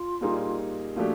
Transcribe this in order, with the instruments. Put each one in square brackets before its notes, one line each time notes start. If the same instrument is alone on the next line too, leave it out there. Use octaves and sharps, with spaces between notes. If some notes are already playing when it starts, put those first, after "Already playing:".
Already playing: [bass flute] F4
[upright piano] A#2 G3 A#3 D#4 G#4
[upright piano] A#2 F3 A3 D4 G4 [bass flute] F#4